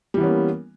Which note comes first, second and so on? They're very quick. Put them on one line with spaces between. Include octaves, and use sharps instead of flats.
G3 E3 B3 C#4 A#3